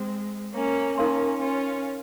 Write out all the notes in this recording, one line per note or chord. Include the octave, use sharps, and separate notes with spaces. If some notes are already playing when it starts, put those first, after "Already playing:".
Already playing: G#3 C4
A#3 C#4
A#3 C#4 D#4 A#4 F5 C6
C#4 F4